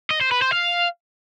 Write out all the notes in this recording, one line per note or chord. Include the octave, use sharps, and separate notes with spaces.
D#5
C5
B4
C5
F5